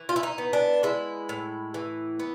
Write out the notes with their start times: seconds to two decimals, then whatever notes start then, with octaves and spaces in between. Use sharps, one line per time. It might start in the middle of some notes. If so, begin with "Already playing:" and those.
Already playing: E3
0.09 F4
0.16 E4
0.23 D#4
0.38 B3
0.53 D4
0.83 G#3 E4
1.29 A2
1.74 E3
2.19 B3